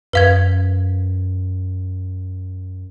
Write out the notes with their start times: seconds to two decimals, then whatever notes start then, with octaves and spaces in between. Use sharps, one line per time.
0.13 F#2 B4 F5 G#6